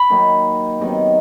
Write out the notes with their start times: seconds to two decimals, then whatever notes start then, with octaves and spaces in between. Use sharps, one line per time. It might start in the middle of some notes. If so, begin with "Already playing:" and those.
Already playing: B5
0.10 D#3 F#3 A#3 D#4
0.80 C3 D#3 F#3 B3